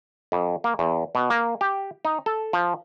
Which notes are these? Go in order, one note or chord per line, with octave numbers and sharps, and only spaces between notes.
F2
A#3
E2
B2
A#3
G4
D#4
A4
F3